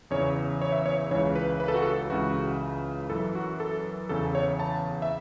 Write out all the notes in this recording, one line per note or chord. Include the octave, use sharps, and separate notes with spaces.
E2 C#3 E3 C#5
C#5
E5
C#5
C#2 C#3 E3 C#5
B4
B4
A4
F#4
A4
C#2 C#3 E3 F#4
F#2 E3 A4
F#4
A4
E2 C#3 E3 A4
C#5
A5
E5